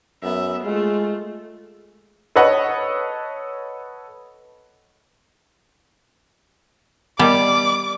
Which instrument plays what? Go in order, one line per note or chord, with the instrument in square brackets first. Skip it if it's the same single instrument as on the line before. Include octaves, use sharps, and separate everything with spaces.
[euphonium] F#2 [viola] B3 E5
[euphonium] G#3 [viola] A3 F4
[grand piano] A4 B4 C#5 D#5 F#5
[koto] G3 [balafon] B3 A#4 D#5 [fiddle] D5 [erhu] D6